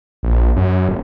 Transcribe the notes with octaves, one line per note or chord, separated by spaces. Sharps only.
A#1
F#2
D#1